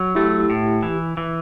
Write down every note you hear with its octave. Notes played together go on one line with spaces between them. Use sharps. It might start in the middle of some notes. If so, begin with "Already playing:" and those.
Already playing: F#3
A3 E4 G4
A2
E3
E3